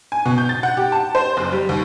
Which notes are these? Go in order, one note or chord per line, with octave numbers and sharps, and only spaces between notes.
G#5
B2
G6
A6
F#5
G4
A5
C5
F#1
G3
D#2